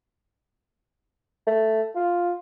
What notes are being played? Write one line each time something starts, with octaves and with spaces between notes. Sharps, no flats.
A3
F4